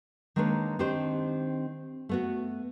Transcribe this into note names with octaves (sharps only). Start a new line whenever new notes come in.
D#3 G#3 A#3 D4 B4 C#5
D#3 C4 D4 D#4 G4 C5
A3 B3 F#4